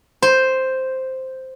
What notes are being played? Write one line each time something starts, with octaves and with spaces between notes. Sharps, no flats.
C5